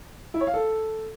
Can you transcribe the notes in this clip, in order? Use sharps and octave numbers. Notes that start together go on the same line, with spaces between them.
E4
C#5
F5
A4